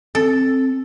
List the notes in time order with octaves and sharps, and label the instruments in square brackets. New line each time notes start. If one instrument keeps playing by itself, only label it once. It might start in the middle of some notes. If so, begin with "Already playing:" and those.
[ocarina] C4 [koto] A4